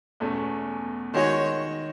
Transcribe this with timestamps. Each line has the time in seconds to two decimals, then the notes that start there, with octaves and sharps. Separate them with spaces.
0.20 E2 B2 A3 C#4
1.14 D#3 G#3 D#4 F#4 C#5